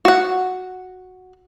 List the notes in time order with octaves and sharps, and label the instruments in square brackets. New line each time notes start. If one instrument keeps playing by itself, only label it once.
[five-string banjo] F#4 F#5